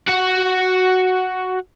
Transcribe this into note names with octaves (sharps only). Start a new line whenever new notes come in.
F#4 F#5